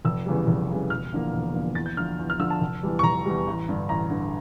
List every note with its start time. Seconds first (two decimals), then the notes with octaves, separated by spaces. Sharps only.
0.05 F1 E6
0.26 E2 C#3 E3 G3
0.47 F1
0.69 E2 C#3 E3 G3
0.90 E1 F6
1.12 E2 D3 F3 A#3
1.33 E1
1.54 E2 D3 F3 A#3
1.75 E2 A6
1.86 G6
1.97 D3 F3 F6
2.19 E2
2.30 F6
2.39 D3 F3 E6
2.50 A5
2.61 F1
2.83 E2 E3 G3
2.99 C#6
3.03 F1 A#5
3.26 E2 E3 G3
3.47 A1
3.69 G2 D3
3.89 A1 A#5
4.10 G2 D3